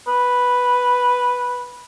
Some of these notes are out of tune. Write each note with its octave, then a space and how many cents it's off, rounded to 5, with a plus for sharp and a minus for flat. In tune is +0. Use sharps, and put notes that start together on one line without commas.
B4 -5